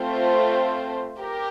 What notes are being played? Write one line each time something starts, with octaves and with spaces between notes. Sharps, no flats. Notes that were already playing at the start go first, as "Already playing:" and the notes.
Already playing: A3 C4 F4 C5
G4 A#4